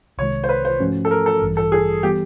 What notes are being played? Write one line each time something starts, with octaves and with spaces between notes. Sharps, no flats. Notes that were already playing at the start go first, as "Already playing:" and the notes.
C2 C3 D#3 G#3 C#5
C5
B4
C5
G#2 F3 A3 C#4 F#4
A4
A#4
A4
A1 G2 E3 G3
A4
G#4
E3 G3 B3 G4